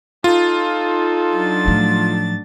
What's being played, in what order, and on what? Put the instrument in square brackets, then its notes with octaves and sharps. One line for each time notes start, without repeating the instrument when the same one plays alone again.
[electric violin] D#4 A4 [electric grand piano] F4
[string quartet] F#3 D4 A6
[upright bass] A2 F3